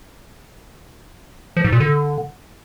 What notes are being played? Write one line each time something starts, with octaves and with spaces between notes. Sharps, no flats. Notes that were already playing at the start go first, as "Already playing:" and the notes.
F3
G#2
A#2
D3